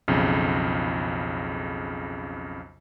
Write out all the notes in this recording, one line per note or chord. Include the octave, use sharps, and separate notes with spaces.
B1 F2 C#3